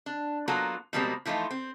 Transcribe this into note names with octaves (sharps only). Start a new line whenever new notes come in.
D4
F#3 A#3 B3 F4 F#4 A4
B2 F3 G3 G#3 A#3 C4
E3 F3 A3 D#4 F4
C4